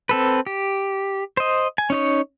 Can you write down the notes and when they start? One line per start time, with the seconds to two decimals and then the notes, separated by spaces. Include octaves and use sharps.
0.09 C4 A4 B4
0.47 G4
1.37 C5 D#5
1.78 G#5
1.90 C#4 D#4 C#5